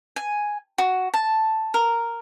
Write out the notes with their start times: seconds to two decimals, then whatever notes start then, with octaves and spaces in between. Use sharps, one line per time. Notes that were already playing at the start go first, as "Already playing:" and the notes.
0.16 G#5
0.78 F#4
1.14 A5
1.74 A#4